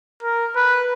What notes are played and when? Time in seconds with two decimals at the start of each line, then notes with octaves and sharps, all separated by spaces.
0.23 A#4
0.56 B4